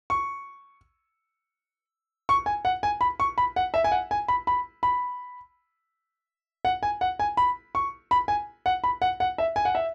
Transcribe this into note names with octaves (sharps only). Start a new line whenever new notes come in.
C#6
C#6
G#5
F#5
G#5
B5
C#6
B5
F#5
E5
G#5
F#5
G#5
B5
B5
B5
F#5
G#5
F#5
G#5
B5
C#6
B5
G#5
F#5
B5
F#5
F#5
E5
G#5
F#5
E5